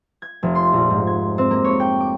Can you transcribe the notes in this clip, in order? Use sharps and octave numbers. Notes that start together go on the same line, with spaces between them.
G#6
F1
C6
A#1
G#2
G#6
C4
A#3
C#5
G5
D6